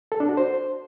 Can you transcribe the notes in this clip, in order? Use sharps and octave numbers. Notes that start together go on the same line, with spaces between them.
A4
D4
F#4
C5